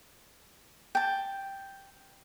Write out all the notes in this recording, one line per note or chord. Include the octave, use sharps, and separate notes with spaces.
G5 A5